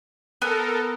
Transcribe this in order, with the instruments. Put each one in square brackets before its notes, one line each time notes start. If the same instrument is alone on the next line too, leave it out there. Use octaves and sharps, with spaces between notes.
[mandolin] B3 [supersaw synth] A4 A#4